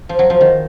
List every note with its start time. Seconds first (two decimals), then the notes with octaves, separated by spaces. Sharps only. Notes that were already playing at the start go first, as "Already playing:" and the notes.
0.09 F3
0.19 F#3
0.30 F3
0.41 D#3